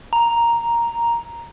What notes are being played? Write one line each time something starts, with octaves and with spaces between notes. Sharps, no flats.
A#5